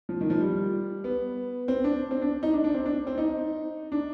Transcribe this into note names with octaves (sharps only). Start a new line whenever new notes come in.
F3
D#3
F3
G3
B3
C4
D4
C4
D4
D#4
D4
D4
C4
D4
C4
D#4
D4